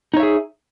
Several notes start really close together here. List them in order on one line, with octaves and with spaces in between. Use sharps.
D#4 C#5 E5 G#4